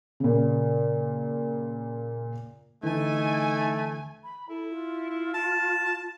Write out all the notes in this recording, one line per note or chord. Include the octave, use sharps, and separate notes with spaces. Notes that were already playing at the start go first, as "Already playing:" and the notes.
A#2 C#3
D3 E3 A3 D#4 G#5
B5
E4 A4
F4
E4
A5